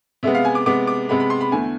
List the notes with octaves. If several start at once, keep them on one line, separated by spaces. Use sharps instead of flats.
C3 G#3 B3 E5
F5
G#5
D6
C3 G#3 B3 D6
D6
C3 G#3 B3 B5
B5
C6
B5
E2 D3 A3 G#5